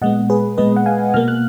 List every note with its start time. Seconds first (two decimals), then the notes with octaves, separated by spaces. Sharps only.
0.02 A#2 G#3 B3 D#5 F#5
0.30 G#4 B4
0.57 A#2 G#3 B3 B4 D#5
0.76 F#5
0.86 F5 G#5
1.14 B2 A#3 F6
1.28 F#6